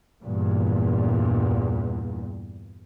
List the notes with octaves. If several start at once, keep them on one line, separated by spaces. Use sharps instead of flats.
E2 G2 A#2